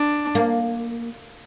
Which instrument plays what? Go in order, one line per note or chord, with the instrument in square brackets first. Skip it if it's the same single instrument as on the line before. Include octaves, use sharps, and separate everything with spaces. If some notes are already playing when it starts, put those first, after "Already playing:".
Already playing: [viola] D4
[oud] A#3